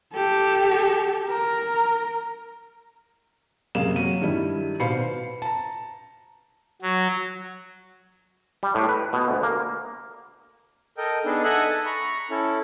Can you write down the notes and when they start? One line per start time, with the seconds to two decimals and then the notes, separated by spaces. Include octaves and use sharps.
0.14 G4 A4
1.29 A#4
3.75 F#2 C3 A#3 G#4 F5 E7
3.96 F#3 F#4 D#7
4.21 G2 D#3 G3 E4
4.80 B2 C5 F5 B5 C7 C#7
4.95 B4
5.42 A5 A#5
6.82 F#3
8.63 G3
8.75 A2
8.89 B4
9.13 B2
9.30 D2
9.43 A#3
10.97 A4 A#4 D#5 G5
11.25 B3 D4 D#4 G#4 A4
11.44 A4 D#5 E5 F#5 G#5 F#6
11.70 A5
11.86 A#5 B5 C#6
12.30 C#4 E4 A4